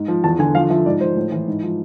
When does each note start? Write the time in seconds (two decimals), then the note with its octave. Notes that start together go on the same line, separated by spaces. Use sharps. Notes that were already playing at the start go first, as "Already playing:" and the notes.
Already playing: G#2
0.08 F3
0.24 E2 A5
0.39 D3 G#5
0.55 F3 F5
0.70 F3 E5
0.86 G#2 D5
1.01 F3 C5
1.16 A2
1.32 E3
1.48 G#2
1.63 F3